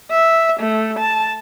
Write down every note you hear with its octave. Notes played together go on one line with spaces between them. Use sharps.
E5
A3
A5